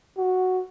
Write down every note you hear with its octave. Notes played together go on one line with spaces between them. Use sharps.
F#4